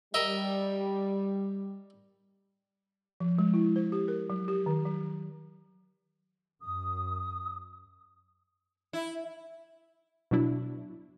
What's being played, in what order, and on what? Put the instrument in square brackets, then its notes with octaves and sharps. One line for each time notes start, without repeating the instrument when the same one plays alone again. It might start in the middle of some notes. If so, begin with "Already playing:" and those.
[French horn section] G3 [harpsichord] A#4 D#5 E5
[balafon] F3
G#3
E4
C5
G4
A#4
F#3
G4
D#3
F#3
[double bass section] F#2 [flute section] D#6
[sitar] E4
[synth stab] B2 F#3 D4 E4